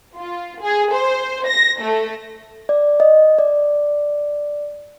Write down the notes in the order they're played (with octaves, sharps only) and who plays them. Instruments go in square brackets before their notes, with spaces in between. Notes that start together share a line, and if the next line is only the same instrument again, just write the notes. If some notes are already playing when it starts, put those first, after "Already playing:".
[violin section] F4
G#4
C5
A#6
A3
[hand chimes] D5
D#5
D5